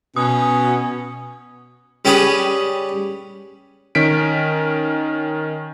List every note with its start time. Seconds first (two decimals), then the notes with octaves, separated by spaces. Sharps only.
0.16 B2 C#4 D#6
2.05 G3 C#4 G4 G#4 B4
3.95 D#3 C#4 B6 D7